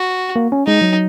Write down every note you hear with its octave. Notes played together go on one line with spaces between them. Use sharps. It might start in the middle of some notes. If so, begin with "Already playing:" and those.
Already playing: F#4
A#3
C#4
G#3 D#4
F#3